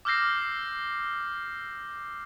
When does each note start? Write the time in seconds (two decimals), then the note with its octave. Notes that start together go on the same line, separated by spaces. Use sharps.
0.05 D6 E6 F6 G6 A#6 C7